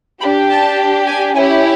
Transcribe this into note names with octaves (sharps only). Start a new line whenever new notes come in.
D4 G4 B5
A5
G#5
C#4 E4 G4 G#5